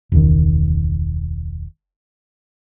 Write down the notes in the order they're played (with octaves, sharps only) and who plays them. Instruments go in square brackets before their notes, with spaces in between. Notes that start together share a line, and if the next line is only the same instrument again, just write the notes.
[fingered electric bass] E1 C#2 D#3